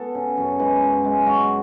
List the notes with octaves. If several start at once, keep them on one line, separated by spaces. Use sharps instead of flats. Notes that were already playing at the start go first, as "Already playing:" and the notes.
Already playing: B3 A4
C#3
F#2
G#3 B4
F#2
G#3
G#3 F#4